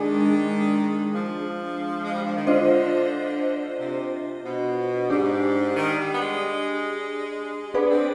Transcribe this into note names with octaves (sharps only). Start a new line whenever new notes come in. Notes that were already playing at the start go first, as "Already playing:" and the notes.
Already playing: D#3 G#3 D4 G#4
F3
G#3
G3
F3
D#3
D3 D4 F4 C5 D#5
C3
B2
G#2 D4 G4 D5
D#3
G3
B3
G#3
B3 D4 G#4 B4 D5
C4